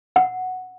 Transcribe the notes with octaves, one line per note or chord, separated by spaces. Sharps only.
F#5